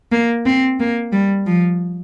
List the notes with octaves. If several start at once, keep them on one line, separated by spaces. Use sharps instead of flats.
A#3
C4
A#3
G3
F3